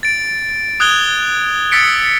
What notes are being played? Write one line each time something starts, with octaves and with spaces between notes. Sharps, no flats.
A6 D7
D#6 F#6 G#6 F7 G7
D#6 E6 A6 B6 C#7 D7